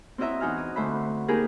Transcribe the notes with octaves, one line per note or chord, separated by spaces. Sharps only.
C4 E4 F#4 D#5 E5 A#5
E2 D#4 F#4 G#5 F6
D#6
D2 A3 C5 E5 B5
A#3 D#4 G4 G#4 A#4 B4